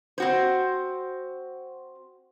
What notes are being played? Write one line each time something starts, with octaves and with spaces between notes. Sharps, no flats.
C4 F#4 C5